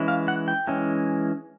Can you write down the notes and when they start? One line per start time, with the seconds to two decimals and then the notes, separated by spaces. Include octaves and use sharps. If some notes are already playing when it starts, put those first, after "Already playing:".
Already playing: E3 G#3 C#4 E4
0.08 F5
0.28 F#5
0.48 G5
0.67 E3 G#3 C#4 E4